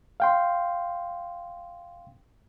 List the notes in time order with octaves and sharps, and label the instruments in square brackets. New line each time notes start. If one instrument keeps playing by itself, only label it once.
[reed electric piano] F5 G5 C6